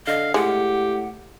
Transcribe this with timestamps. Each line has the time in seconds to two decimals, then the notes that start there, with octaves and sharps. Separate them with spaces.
0.07 D3 D#5 F5
0.34 A2 G#3 G4 F#5